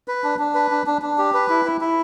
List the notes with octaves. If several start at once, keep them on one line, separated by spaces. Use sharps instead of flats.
B4
D4
D4
B4
D4
D4
D4
G4
B4
E4
E4
E4